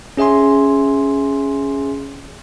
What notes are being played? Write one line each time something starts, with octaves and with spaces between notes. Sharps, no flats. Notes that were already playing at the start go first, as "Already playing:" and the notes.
C#4 G#4 E5 G#5 C6